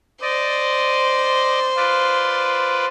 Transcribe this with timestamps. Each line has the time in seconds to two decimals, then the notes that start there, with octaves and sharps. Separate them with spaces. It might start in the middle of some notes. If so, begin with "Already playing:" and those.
0.22 C5 D5 D#5
1.76 F4 B4 D5